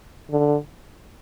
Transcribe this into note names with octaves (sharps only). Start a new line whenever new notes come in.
D3